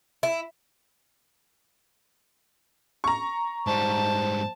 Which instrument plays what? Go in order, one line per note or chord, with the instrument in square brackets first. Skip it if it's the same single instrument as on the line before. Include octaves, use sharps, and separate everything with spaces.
[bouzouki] E4
[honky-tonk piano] A#5 C#6
[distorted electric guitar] G#2 G3 [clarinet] C5 [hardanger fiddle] A5